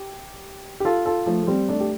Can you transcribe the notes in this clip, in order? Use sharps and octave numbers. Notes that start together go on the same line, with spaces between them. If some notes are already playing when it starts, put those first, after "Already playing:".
Already playing: G4
G4
F4 A4
F4 A4
F3 A3
A3
G3 C4
A3 D4
G4